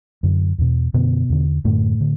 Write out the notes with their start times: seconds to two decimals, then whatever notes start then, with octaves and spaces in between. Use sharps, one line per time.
0.23 F#2 D3
0.58 E2 B2
0.94 F#2 B2 D3 B3
1.29 E2 D3
1.65 F#2 A2 D3 A3
2.01 D3